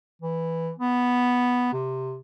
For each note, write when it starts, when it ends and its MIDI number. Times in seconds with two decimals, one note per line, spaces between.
0.22 0.71 52
0.79 1.72 59
1.73 2.18 48